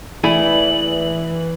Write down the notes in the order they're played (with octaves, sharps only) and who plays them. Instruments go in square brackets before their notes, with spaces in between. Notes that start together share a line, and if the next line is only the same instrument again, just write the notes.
[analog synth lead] E3 [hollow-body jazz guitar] A3 E4 G#4 [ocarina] D5 [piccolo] F#7